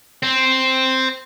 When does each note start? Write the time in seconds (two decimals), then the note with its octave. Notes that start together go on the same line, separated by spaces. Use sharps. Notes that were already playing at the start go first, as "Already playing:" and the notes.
0.23 C4